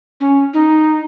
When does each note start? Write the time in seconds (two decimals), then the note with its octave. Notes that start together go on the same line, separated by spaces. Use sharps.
0.21 C#4
0.54 D#4